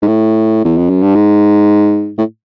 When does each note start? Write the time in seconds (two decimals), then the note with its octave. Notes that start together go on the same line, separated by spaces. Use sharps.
0.02 G#2
0.07 A2
0.64 E2
0.77 F2
0.90 F#2
1.02 G2
1.15 G#2
2.18 A2